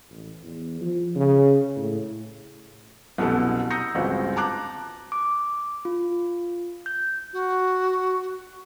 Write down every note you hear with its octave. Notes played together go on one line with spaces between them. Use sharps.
A1
E2
F3
C#3
A2
C2 F#2 B2 B3 A4
A#5 D#6 E6 G6 A#6 C#7
G1 C#2 C4 F#4
A5 A#5 D6 F#6
D6
F4
G6
F#4